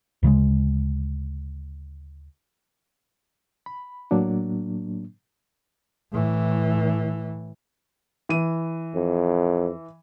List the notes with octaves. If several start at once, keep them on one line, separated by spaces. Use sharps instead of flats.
D2 C#3 G3 G#3
B5
A2 F#3 A#3 D4
A2 E3
E3 D#7
F2